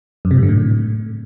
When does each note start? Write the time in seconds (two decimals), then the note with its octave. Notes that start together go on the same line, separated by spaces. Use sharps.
0.25 F#2
0.31 C3
0.37 G#2
0.43 D3
0.49 A2